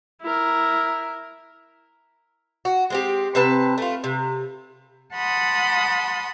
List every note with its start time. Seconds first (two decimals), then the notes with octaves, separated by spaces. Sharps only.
0.22 E4 A#4
2.65 F#4
2.90 G#3 C4 G4
3.35 C3 C4 B4 A5
3.78 A3 F4
4.04 C3
5.15 F#5 A5 B5 C6 D#6